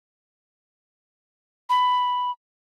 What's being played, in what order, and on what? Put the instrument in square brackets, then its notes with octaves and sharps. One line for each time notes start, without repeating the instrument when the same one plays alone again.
[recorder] B5